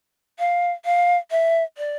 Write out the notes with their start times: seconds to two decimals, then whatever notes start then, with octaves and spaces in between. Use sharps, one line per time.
0.39 F5
0.85 F5
1.31 E5
1.78 D5